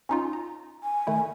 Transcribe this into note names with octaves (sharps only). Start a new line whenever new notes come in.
C#4 D#4 F4
A#5
G#5
D#3 A3 E4